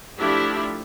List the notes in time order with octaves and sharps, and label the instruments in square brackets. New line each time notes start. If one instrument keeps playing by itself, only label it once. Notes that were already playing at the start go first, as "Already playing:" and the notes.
[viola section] F3 A3 D4 E4 G4